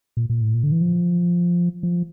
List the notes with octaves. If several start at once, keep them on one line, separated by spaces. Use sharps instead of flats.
A#2
A#2
A2
A#2
D3
E3
F3
F3